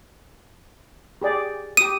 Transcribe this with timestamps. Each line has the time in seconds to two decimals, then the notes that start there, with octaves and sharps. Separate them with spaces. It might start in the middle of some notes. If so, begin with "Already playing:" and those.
1.22 G4 G#4 D5
1.77 G4 D#6 D#7